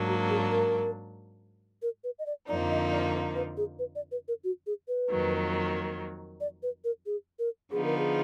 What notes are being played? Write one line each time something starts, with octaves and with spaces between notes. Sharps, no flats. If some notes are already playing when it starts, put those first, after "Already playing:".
Already playing: G#2 F#3 A#3 D4
F#4
G#4
A#4
A#4
B4
D#5
D5
F2 D3 F3 A#3 D#4 D5
D#5
D5
B4
G#4
B4
D5
B4
A#4
F#4
G#4
B4
F2 D#3 F#3 A#3
D5
B4
A#4
G#4
A#4
D3 F3 B3 D#4 G#4
A#4
G#4